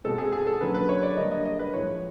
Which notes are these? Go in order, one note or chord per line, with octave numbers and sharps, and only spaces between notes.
B2 G#3 C4 A4
G#4
G#4
A4
D3 F#3 A#3 C#4 B4
B4
C#5
D5
D3 G3 A#3 D#5
D#5
D#5
B4
A2 F3 G#3 C#5